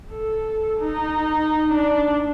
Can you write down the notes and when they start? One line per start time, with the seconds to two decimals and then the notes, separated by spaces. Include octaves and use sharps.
0.11 A4
0.80 D#4
1.71 D4